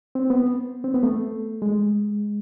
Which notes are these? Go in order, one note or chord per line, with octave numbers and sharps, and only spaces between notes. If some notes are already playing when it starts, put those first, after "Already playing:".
C4
B3
C4
B3
A3
G#3